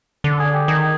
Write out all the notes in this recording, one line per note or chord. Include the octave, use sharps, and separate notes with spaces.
D3
A4
G#4
G4
D#3 G#4